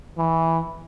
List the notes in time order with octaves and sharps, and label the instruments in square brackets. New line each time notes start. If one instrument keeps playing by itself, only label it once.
[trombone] E3